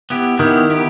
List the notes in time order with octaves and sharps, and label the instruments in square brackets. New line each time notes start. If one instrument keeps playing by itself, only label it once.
[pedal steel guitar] B3 E4 G4
[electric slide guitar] D#3 [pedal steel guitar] B3 E4 G4
[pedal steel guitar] B3 E4 G4